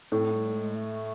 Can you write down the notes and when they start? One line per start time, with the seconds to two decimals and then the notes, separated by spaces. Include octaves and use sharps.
0.12 A2 C4
0.33 G3
0.54 G#3
0.74 A3